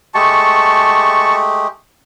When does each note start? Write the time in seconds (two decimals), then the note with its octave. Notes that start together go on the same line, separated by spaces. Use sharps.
0.15 G#3 A3 G4 A5 C#6